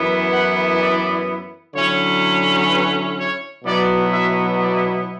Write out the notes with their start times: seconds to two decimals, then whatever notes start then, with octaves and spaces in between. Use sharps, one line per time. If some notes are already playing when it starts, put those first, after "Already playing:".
Already playing: F#2 E3 B3 E4
0.32 F#5
0.79 D5
1.74 D3 F#3 C#4 E4 C#5
2.69 B4
3.18 C#5
3.64 B2 F#3 B3 E4 D5
4.13 E5
4.61 D5